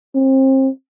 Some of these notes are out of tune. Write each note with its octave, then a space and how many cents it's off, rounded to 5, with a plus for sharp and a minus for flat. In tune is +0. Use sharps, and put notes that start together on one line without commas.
C4 +30